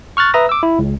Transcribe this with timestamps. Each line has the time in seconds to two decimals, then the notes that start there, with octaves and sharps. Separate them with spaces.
0.17 C#6 F6 F#6 A6
0.34 B4 E5 A#5 D#6 A#6
0.49 D6 E6
0.63 E4
0.79 C#2